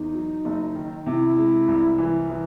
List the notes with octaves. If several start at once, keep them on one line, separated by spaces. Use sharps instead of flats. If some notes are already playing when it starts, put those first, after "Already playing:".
Already playing: E2 D#4
F#3
F#1
D#3
C3 E4
G#3
C2
E3
E3